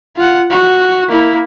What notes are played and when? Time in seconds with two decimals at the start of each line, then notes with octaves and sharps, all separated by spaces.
0.16 F4 F#5
0.51 F#4
1.09 A#3 E4